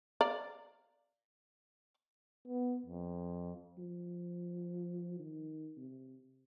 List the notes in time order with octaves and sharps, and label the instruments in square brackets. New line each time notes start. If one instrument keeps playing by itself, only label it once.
[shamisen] D5 F5 A#5
[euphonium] B3
F2
[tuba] F3
D#3
C3